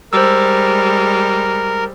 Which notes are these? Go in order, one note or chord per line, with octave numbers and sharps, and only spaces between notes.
G3 G#3 A#4 C5 E6